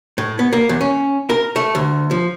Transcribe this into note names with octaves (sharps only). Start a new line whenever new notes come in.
A2
B3
A#3
E2
C#4
A#4
A3
D2
F3